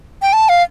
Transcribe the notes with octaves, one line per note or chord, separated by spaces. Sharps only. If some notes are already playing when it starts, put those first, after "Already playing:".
G5
A5
F5